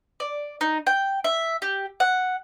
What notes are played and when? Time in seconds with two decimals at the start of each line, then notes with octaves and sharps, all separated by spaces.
0.20 D5
0.61 D#4
0.87 G5
1.24 E5
1.62 G4
2.00 F#5